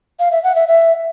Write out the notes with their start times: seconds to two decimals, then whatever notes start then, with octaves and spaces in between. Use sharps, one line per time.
0.20 F5
0.32 E5
0.43 F#5
0.55 E5
0.67 E5